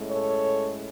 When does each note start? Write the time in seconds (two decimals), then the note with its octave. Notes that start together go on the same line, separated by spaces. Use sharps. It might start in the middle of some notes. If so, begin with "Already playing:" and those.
Already playing: A2 G#3 C#4
0.10 A4 C#5